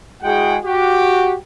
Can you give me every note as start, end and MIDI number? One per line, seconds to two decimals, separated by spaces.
0.23 0.57 56
0.23 0.57 64
0.23 0.57 66
0.23 0.57 68
0.23 0.57 78
0.23 0.57 79
0.64 1.35 66
0.64 1.35 67